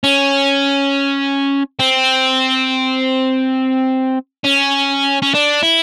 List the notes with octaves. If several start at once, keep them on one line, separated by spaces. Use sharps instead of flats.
C#4
C4
C#4
C#4
D4
E4